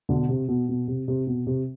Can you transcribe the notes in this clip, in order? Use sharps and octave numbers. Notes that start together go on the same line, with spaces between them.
B2 D3
C3
B2
B2
C3
C3
B2
C3